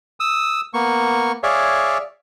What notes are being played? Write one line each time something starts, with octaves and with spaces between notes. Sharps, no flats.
D#6 E6
A#3 B3 C#6
G#4 C#5 D5 E5 F5